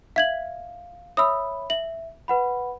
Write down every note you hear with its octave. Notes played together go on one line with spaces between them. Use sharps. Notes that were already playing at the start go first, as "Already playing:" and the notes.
E5 F5 G#6 F#7
C#5 E5 B5 D#6 E6
E5 F#7
B4 F#5 B5